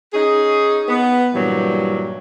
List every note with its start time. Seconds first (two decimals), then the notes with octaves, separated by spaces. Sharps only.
0.14 C#4 D#4 G#4
0.88 B3
1.34 G2 A#2 E3 F#3 G3